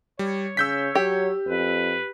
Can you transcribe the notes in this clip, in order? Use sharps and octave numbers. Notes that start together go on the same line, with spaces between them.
G3 C#5
C#3 E6 G6 B6
F#3 G4
F2 B4